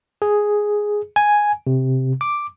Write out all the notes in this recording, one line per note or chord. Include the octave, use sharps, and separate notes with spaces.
G#4
G#5
C3
D6